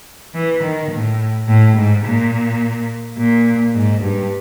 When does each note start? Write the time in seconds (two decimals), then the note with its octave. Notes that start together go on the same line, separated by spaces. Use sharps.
0.34 E3
0.63 D#3
0.91 A2
1.48 A2
1.76 G#2
2.04 A#2
3.18 A#2
3.74 G#2
4.03 G2